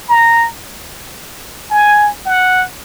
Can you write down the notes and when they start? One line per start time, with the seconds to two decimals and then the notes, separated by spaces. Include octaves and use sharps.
0.09 A#5
1.71 G#5
2.26 F#5